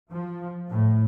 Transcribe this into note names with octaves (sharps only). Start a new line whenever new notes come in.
F3
A2